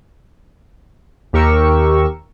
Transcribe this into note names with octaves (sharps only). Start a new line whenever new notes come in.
D#2 G4 A#4 C#6 E6